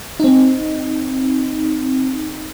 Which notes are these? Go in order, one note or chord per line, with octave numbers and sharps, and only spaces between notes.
C4 D#4